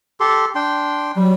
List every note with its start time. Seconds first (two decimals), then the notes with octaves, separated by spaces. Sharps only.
0.20 G4 A4 C6
0.55 D4 G5 C6
1.16 F#3 G3